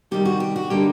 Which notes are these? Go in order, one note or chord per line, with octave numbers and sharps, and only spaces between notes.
C3 D#3 G3 G4
F#4
G4
F#4
D3 G3 A#3 D#4 G4